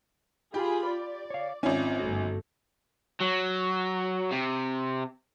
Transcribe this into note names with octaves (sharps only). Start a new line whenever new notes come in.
F4 G4 G#4 B5
D5
C#5 F5
G#1 C4 C#4 F4 E5
G1 A3 F#4
F#3
C3